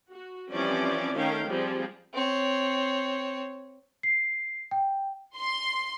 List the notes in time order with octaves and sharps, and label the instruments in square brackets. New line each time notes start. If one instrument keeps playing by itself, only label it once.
[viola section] F#4
E3 F3 G3 C4 C#4 D5
D#3 A3 C#4 D#4 F5 G5
F3 G3 C4 G#4
[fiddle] C4 C#5
[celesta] C7
G5
[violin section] C6